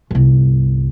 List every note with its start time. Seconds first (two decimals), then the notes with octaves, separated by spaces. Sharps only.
0.11 G1 C2